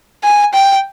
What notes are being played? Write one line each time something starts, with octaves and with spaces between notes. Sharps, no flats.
G#5
G5